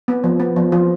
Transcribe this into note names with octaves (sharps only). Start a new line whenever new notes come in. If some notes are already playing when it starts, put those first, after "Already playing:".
B3
F3
B3
F3
F3 F4